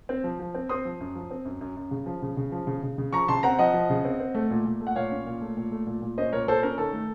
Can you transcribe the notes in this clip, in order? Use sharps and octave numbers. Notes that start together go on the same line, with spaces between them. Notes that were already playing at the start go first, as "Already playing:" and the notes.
C4
F3
F3
C4
C4 C6 D#6
F3
F#2
F3
C4
F#2
F#2
F#2
C#3
F3
C#3
C#3
F3
C#3
C#3
C#3
F3 A#5 C#6
C#3 A5 C6
C4 F#5 A#5
F3 D#5 F#5
F3
C#3
C4
C4
A3
A#2
A#2
A3
F#5
A#2 C#5 F5
C#4
A#2
A3
A#2
A3
A#2
A#2
C#4 C5 D#5
A#2 A#4 C#5
A#2 A4 C5
C#4 A#4
D#3 A4
A3